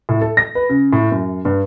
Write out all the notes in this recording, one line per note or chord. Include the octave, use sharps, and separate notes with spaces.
A2
A4
A#6
B4
C#3
A2
F#2
G2